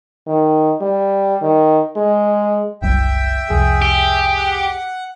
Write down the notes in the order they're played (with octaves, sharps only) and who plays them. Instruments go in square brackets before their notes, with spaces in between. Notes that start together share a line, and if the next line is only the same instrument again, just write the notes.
[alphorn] D#3
G3
D#3
G#3
[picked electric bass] F#1 C2 G3 [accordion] E5 G5
[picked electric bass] C2 F2 [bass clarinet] G#4
[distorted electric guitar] G4
[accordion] F#5